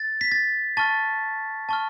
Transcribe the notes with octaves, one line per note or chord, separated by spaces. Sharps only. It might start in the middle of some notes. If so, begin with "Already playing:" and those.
Already playing: A6
B6
A6
A5 C#6 F6 A6
A5 C#6 F6